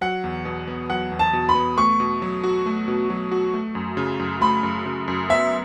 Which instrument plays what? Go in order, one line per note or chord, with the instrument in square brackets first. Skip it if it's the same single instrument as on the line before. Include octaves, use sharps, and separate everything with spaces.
[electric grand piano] F#3 [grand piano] F#5
[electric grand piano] E2
B2
B3
[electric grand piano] F#3 [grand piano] F#5
[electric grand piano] E2
[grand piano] A5
[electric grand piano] B2
[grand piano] B5
[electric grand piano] B3
[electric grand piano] A3 [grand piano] C#6
[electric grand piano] B2
F#3
F#4
A3
B2
F#3
F#4
A3
F#2
C#3
F#2
[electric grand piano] A3 [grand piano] B5
[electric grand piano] F#2
C#3
F#2
[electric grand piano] B3 [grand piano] E5